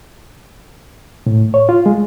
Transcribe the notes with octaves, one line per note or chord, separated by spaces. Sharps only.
A2
C#5
F4
G#3